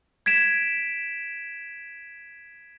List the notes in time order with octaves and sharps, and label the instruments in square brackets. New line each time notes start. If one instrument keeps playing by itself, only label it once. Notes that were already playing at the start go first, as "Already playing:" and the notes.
[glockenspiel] G#6 B6 D7 E7